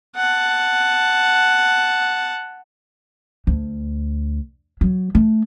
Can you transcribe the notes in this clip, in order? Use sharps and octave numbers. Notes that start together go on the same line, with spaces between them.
F#5 A5
D2
F#3
A3